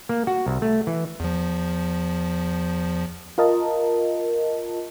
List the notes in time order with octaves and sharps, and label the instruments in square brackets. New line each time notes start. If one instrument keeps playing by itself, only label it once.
[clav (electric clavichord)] A#3
F#4
C2
A3
E3
[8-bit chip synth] E2 F3
[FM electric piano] F4 A#4 D#5 A5